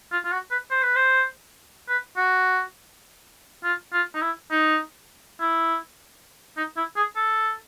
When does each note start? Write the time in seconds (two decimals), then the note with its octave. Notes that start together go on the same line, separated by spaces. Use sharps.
0.12 F4
0.25 F4
0.32 F#4
0.51 B4
0.71 C5
0.82 B4
0.96 C5
1.88 B4
2.16 F#4
3.64 F4
3.93 F4
4.14 D#4
4.22 E4
4.51 D#4
5.40 E4
6.57 D#4
6.77 E4
6.96 G#4
7.16 A4